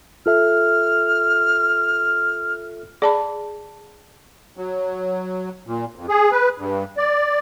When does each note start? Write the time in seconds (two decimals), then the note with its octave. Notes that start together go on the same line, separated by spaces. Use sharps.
0.26 F4 A4 E5 F6
3.02 G#4 D5 A5 B5
4.57 F#3
5.66 A#2
5.95 F2
6.09 G#4
6.32 B4
6.58 G2
6.97 D5